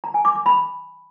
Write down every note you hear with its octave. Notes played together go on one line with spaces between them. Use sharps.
A#5
G#5
D6
D6
B5